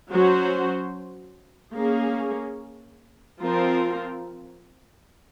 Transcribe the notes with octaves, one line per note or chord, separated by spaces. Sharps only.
F#3 C#4 F#4 C5
A#3 C#4 G#4
F3 C4 F4 A#4